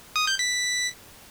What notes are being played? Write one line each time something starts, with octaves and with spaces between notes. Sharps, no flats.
D#6
G6
B6